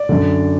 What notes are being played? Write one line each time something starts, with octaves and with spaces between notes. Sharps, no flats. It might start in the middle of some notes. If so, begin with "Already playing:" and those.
Already playing: D5
F#2 D3